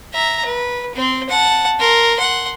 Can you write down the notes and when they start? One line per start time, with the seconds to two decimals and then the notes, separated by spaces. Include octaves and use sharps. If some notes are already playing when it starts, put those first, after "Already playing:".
0.13 E5 A#5
0.45 B4
0.94 C4 C5
1.29 F#5 A5
1.79 A#4 C6
2.17 F#5 C6